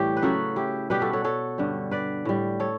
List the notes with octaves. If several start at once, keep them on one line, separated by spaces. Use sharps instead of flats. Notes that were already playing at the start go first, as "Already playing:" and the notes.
Already playing: A2 E3 G3 G4 C#5
B4
C#3 F#3 F#4 A4
E4 G4
B2 G3 G4 B4
F#4 A4
A4 C#5
A4 C#5
G2 D3 G3
B4 D5
A2 G3
A4 C#5